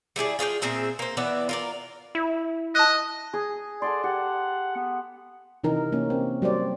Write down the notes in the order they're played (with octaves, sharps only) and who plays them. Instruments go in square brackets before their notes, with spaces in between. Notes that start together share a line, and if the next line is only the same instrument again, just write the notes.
[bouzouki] G3 E4 G#4 D5
F4 G#4 C#5 G5
A#2 C4 G#4 E5
A#3 C5
E3 B3 D5 E5
F4 A#4 D5
[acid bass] E4
[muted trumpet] D#5 [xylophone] A5 D#6 F#6
[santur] G#4 D#6
[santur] A4 F#5 C6 [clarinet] D5
[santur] G4 [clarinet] F#5
[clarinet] B3
[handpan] C3 E3 D#4 A#4
A#3 C#4
C4
F#3 G3 C5 D5